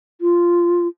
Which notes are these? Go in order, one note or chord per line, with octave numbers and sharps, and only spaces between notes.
F4